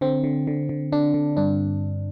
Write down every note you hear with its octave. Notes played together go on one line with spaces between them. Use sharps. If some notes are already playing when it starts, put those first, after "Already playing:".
D3 C4
D3
D3
D3
D3 D4
D3
G2 D4